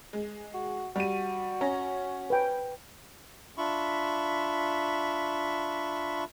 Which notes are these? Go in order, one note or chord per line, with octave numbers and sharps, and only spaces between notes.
G#3
F#4
G3 F#4 D#7
C#4 A#5
B4 G5
D4 F4 E5 B5 C#6